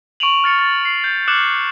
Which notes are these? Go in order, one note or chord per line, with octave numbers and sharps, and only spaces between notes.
C#6 D7 D#7 F7 F#7
F6 A6 C#7 F7
A6
C7
G6
D6 F6 F#6 C#7 E7 F#7